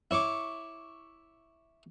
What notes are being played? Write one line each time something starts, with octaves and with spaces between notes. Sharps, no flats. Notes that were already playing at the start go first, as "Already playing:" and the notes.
E4 C#5 C#6 D6